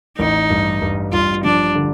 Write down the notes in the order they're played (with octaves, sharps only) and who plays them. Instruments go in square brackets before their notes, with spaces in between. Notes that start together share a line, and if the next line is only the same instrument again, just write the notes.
[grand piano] A1 [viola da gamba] D#4
[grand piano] G2
G2
[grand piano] G2 [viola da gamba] F4
[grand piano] F3 [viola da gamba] D4
[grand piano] D3